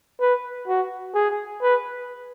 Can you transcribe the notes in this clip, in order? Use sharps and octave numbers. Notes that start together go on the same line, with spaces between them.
B4
F#4
G#4
B4